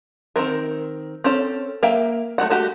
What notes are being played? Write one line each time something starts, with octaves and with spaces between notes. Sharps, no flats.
D#3 F3 C4 A#4
C4 C#4 A4
A#3 E5 F5 G5
A3 C#4 F#4 F#5
A3 F#4 G4